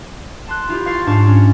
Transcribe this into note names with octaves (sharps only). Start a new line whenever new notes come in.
A5 C6 F#6
E4 F4 G4
F5 C6 C#6 A6 C7
G#2 D4 F5 A5 C#6
C#4